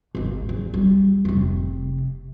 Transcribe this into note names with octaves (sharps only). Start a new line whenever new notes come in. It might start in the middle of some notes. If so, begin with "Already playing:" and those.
G#1 D#2
E2
G3
F1 C3